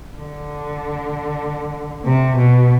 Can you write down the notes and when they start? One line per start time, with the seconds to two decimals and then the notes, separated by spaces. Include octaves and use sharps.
0.18 D3
2.06 C3
2.37 B2